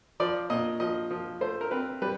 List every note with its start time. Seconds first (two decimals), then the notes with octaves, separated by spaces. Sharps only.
0.20 F3 D5
0.50 A#2 D#5
0.80 F3 D#5
1.11 F3
1.41 A3 C5
1.61 A#4
1.71 C4 B4
2.02 G3 B4